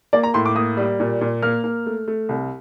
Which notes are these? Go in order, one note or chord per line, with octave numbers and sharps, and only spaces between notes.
A#3 D5
A#5
A2 C6
D6
A#3 D#6
G3
A#2
A#2
A#3 F6
A#3
A3
A3
C2